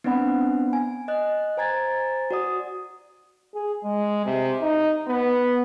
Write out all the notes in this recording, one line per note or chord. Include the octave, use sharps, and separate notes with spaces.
B3 C4 D4 D5 F#5 B5
G#5
D#5 F#6
C5 G#5 A#5 G#6 A6
F#4 D5 D#6
G#4
G#3
C3
D#4
B3